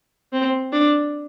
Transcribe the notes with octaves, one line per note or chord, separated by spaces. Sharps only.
C4
D4